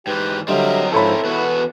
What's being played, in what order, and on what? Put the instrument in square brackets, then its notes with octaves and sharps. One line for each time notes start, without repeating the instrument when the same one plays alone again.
[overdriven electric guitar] G#2 E3 [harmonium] G4 G5 [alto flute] B4
[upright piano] D3 G3 [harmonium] F#3 D#5 [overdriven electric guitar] C4 A#4 [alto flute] E5
[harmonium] G#2 F3 [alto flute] E4 [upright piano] A4 C#5 B5
[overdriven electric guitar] E2 F#4 [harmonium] B3 B4